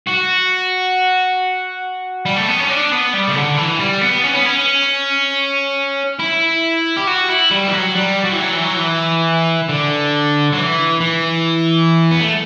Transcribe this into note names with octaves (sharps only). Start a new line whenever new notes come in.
F#4
G3
A3
B3
C#4
D4
B3
G3
C#3
D3
E3
G3
B3
C#4
B3
C#4
E4
G4
F#4
E4
G3
E3
F#3
G3
F#3
E3
F#3
E3
F#3
E3
D3
F#3
E3
E3
B3
A3